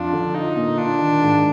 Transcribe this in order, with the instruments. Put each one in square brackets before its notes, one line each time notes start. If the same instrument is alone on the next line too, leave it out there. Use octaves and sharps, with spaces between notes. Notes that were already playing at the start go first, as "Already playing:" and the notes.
Already playing: [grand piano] F2 F4 [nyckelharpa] D4
[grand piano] D3
[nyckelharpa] D#4 [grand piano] F4
[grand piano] A#2
[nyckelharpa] D4 [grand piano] F4
[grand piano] D#3
G#2